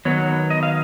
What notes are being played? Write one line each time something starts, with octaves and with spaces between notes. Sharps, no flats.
D#3 F#3 B3 C#5
D#5
F5